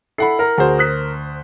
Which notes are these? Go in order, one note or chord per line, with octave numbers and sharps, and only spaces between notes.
E4 A4 F#5 B5 C7
A#4
D2 F#4 G#4 C5
D#6 F#6 B6